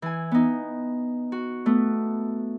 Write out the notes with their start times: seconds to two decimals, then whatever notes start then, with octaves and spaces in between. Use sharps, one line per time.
0.02 E3 G#5
0.31 B3 D#4
1.32 F#4
1.66 A3 B3